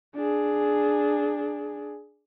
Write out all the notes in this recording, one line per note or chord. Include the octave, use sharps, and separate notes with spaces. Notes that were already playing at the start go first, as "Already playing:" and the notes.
D4 G#4